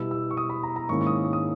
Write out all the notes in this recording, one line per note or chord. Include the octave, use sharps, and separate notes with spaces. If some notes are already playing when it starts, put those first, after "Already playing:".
Already playing: B2 G3 B3 E4 E6
E6
C#6
D#6
B5
A#5
A#5
G#2 D#3 A#3 C#4 E4 C#6
C#6
D#6
C#6
D#6